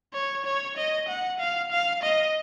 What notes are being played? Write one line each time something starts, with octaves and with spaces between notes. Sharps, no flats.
C#5
C#5
D#5
F#5
F5
F5
D#5